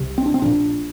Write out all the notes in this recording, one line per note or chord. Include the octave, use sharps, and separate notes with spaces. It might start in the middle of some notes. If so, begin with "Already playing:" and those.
Already playing: C2 C3
C4
D4
C4
A#1 A#2 D4